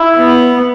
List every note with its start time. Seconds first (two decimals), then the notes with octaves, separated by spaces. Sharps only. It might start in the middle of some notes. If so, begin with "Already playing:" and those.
Already playing: E4
0.16 B3